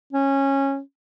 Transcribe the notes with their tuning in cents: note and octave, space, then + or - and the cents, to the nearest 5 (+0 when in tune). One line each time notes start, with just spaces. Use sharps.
C#4 -15